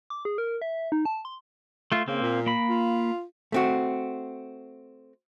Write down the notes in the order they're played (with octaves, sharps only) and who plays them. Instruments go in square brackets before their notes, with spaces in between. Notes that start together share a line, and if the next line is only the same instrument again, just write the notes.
[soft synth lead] D6
G#4
A#4
E5
D#4
A5
C6
[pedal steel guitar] A3 F4
[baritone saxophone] C#3 [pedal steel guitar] A#3 C4
[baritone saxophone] A#2
[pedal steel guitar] A#3 B5
[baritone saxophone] F4
[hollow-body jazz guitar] A3 C4 F#4